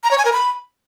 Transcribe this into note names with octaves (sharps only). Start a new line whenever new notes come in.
A#5
C#5
G#5
A#4
B5